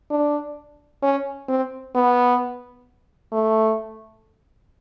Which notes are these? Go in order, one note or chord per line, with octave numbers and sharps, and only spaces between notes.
D4
C#4
C4
B3
A3